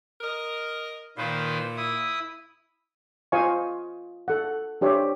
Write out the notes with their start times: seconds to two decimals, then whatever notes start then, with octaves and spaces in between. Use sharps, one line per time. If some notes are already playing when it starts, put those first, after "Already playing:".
0.21 A#4 D#5
1.17 A#2 D#3 B4 C5
1.77 E4 D#6
3.32 F4 C5 D#5 F5 G#5 C#6
4.28 A4 F#5
4.81 D4 G4 C5 C#5 E5